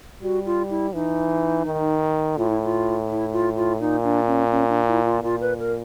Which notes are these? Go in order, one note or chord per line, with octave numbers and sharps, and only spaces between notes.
G3 F#4
F4
E4
E3 D#4
D#3
A2 F4
E4
F4
E4
F4
F4
A#2 D#4
D4
C#4
C#4
D4
E4
F4
A#2 F4
B4
A#4